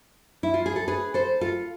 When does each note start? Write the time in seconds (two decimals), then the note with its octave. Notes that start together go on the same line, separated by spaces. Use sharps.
0.43 E4
0.54 F4
0.66 G#4
0.76 A4
0.88 G#4 B4
1.14 A4 C5
1.41 F4 A4